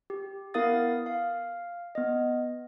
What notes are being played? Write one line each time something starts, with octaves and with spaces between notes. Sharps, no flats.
G4
B3 E4 A#4 F5 D#6 A6
F5
B3 D#5